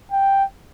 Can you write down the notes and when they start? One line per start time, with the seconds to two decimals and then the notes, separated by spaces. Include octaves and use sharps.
0.12 G5